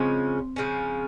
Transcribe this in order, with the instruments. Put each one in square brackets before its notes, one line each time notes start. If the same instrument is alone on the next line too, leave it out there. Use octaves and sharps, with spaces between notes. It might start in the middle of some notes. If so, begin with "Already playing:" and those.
Already playing: [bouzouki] C#3 F3 G#3 C#4 [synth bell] C4
[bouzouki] C#3 F3 G#3 C#4